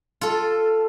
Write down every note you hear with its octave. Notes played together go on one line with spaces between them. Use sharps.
F4 A4